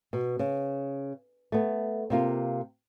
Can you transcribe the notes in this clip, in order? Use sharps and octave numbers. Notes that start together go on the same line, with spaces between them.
B2
C#3
A3 B3
C3 A#3 F4